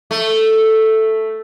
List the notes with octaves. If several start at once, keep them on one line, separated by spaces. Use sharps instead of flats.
A3